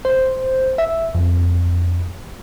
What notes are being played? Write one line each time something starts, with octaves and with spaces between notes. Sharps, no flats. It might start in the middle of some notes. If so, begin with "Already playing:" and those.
C5
E5
F2